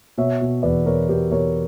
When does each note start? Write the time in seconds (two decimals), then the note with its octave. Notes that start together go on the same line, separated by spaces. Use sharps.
0.18 B2 C#5 E5
0.41 B2
0.63 E2 B4 D5
0.86 B2 A#4 C#5
1.09 B2 G4 B4
1.31 B2 A#4 C#5